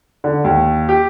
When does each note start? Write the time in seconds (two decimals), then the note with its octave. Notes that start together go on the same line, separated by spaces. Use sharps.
0.24 D3
0.44 D#2
0.89 G4